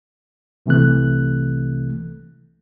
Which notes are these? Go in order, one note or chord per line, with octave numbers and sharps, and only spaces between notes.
C2 C3 E3 A3 F#6